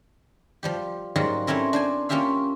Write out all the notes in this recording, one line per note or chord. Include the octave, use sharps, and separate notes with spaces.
F3 G3 G4
G#2 F#3 G3 A#3 F4 F#5
A3 C4 C#4 E4 A#4
D4 C5 G#5
A#3 C#4 F4 G4 E5 F5